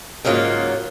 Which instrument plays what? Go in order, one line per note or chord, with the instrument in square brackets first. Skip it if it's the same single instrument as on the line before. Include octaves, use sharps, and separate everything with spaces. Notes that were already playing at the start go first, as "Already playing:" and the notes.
[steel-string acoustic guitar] G#2 C#3 F#3 G#3 A#3 F4